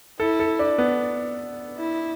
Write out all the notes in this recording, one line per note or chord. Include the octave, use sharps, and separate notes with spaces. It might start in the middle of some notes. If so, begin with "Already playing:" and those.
E4 A4
A4
D4
B3
E4